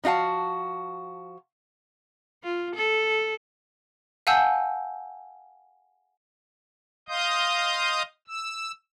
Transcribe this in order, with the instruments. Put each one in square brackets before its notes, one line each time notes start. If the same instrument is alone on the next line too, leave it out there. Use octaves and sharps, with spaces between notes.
[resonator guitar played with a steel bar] F3 D#4 F#4 F5 A5
[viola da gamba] F4
A4
[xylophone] F5 F#5 G#5 A5 E6 G6
[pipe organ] D#5 F5 C6 D#6 G6
E6